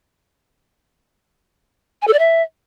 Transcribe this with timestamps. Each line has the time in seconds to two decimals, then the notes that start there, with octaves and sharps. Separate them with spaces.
2.02 G#5
2.07 A4
2.13 D5
2.19 E5